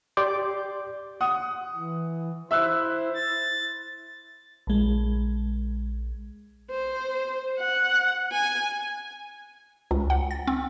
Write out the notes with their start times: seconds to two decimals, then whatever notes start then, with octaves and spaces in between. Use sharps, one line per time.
0.17 G4 D5 C6 D6 G6
1.21 F#5 D#6
1.75 E3
2.51 E4 C5 E5 E6 F#6
3.15 A6
4.67 A#1 G#3
6.71 C5
7.59 F#5
8.32 G#5
9.91 C#2
10.10 F#5
10.31 A6
10.47 C4